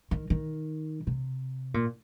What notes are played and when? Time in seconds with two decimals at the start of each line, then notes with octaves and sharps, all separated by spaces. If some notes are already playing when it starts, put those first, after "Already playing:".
0.11 D#3
0.30 D#3
1.07 C3
1.74 A#2